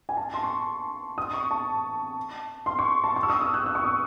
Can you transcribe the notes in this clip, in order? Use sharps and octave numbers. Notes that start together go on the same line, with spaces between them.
G#5
A5
C6
C#6
D#6
C#6
A5
C6
C#6
A5
C#6
E6
D#6
E6
F#6
E6
C#6
D#6